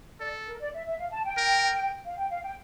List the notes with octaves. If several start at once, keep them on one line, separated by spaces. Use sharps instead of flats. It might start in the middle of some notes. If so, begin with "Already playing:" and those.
A4 D5
A#4
D5
E5
E5
F5
A5
G5
A#4
F5
G5
F5
G5